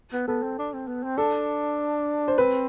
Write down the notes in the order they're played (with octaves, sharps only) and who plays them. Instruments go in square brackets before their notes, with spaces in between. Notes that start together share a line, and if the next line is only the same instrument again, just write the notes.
[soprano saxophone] B3
[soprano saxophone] B3 [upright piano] A4
[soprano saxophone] C4
D4
C4
B3
C4
[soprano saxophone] D4 [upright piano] A4
[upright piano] C5
[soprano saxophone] C4 [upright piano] B4